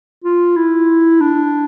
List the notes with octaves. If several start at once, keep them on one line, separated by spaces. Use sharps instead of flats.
F4
E4
D4